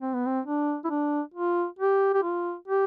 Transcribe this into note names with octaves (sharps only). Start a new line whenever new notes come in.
C4
B3
C4
D4
E4
D4
F4
G4
G4
F4
G4